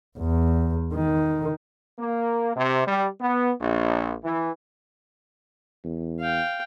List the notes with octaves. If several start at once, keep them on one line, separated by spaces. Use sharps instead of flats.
E2
D#3
A#3
C3
G3
B3
A#1
E3
E2
F5 G5